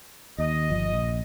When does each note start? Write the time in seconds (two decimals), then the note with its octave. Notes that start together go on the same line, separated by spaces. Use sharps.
0.38 D#2 D#5
0.70 G1 F3
0.94 A#1